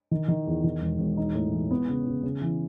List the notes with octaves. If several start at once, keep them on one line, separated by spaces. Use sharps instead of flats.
D#3
D#3
E2
D#3
E1
E1
D#4
A2
E3
B3
C#3
C#3
C#3
E3